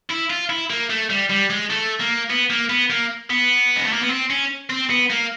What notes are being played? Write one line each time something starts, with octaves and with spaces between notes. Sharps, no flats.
E4
F4
E4
A#3
A3
G3
G3
G#3
A3
A#3
B3
A#3
B3
A#3
B3
G#3
A3
A#3
B3
C4
C#4
C4
B3
A#3